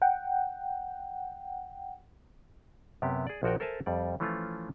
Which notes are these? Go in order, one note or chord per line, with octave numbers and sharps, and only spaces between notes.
F#5 G5
F#2 C3 B3 G4
G#4 D5
A#1 F3 F#4 A#4 G5
A4 A#4 C5 E5 G#5 A5
F2 G3 D5
E3 F3 A3 C#4 F4